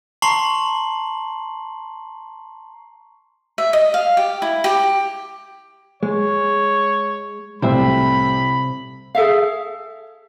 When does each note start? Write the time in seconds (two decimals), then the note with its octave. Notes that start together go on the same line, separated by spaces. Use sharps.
0.22 A5 A#5 C6 C#6 C7 F#7
3.58 E5
3.73 D#5
3.94 F5
4.17 G4
4.42 E4
4.64 G4
6.03 G#3 C#5
7.62 C2 A2 C3 C5 E5 G5 B5
9.15 G#4 A4 E5 F5